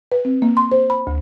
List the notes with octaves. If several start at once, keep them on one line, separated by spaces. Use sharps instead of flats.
B4
C4
A#3
C6
C5
B5
D2